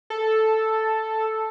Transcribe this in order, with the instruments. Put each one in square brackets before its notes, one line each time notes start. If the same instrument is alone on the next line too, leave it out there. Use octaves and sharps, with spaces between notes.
[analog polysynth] A4